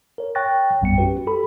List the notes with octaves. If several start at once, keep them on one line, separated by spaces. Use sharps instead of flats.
A#4 C#5
C#5 G5 C#6 F#6 A6 A#6
A#1 F#2 G3 B3 G5 C#7
C#4 F#4 G4 B4
G4 A4 B5